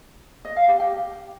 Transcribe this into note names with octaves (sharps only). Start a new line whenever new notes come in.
D#5
F5
G4
G5